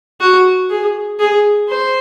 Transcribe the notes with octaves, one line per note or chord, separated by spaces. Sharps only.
F#4
G#4
G#4
C5